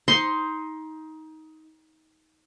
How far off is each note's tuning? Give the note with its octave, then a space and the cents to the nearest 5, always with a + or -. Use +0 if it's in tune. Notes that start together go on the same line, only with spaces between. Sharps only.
D#4 +20 C6 +0